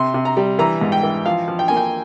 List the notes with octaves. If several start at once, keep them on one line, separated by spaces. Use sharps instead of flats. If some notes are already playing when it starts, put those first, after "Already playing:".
Already playing: C3 C6
C3
A#5
G3
E3 A#5
G#2
G5
E3
F3 F5
F3
G5
A#3 G#5
G5